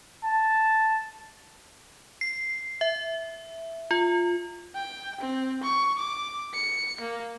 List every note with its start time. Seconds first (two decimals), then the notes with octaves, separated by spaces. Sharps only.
0.24 A5
2.21 C7
2.81 E5
3.91 F4
4.76 G5
5.21 C4
5.63 C#6
5.99 D6
6.54 C#7
7.01 A#3